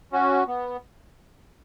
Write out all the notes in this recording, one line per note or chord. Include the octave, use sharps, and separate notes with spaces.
C#4 F#4
B3